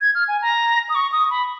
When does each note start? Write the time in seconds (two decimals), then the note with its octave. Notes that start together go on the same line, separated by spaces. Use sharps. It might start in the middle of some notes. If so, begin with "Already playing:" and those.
0.01 G#6
0.15 F6
0.28 G#5
0.42 A#5
0.89 D#6
0.95 C#6
1.12 D#6
1.30 B5